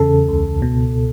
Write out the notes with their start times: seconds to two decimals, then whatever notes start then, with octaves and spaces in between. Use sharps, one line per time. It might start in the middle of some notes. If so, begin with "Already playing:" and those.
Already playing: E2 C#3 A4
0.28 C#2
0.62 B2